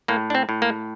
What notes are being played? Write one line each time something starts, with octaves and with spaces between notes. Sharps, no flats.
A2 A#3
D4
C4
A2
A#3